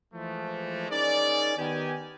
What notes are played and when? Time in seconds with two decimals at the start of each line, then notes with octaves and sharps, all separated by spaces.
0.14 E3 F3 G#3 A3
0.90 C#4 D#4 G#4 A#4 D5
1.57 D#3 B3 G4 G#5